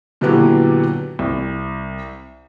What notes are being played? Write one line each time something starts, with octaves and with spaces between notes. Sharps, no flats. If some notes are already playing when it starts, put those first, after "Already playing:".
A#2 D3 E3 F#3 B3 G4
C2